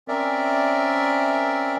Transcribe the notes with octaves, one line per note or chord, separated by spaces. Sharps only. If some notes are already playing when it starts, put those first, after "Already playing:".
C4 C#4 A#4 D5 E5